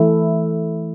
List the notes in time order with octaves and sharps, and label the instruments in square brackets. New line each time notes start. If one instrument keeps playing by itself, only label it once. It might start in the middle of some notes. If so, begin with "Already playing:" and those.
Already playing: [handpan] E3 A3 E4